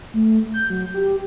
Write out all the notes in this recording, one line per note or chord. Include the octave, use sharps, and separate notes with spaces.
A3
G6
F#3
G4